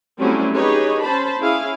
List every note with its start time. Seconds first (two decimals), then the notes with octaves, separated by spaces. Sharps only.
0.19 F#3 G3 A3 C4 C#4 E4
0.55 D#4 G4 G#4 B4 C#5
1.02 C#4 C5 A5 B5
1.38 C#4 E4 G#4 F5